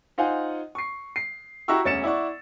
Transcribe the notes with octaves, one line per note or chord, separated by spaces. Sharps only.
D#4 F4 C5 F5 F#5 G#5
C#6 C7
C7
E4 F#4 G4 A#5 C#6 E6
E1 D2 C#4 A6 C#7 E7
E4 D5 F#5 C#6